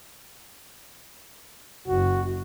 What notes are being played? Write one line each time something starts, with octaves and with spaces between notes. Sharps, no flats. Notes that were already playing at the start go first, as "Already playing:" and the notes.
F#1 F#4